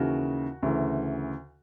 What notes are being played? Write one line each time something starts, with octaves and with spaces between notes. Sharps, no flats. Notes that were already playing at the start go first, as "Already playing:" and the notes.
Already playing: D#2 C#3 E3 F#4
D2 C#3 E3